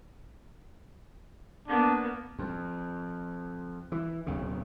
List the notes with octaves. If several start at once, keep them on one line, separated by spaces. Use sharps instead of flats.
A#3 B3 D4
F2
E3
D1 B1 C#3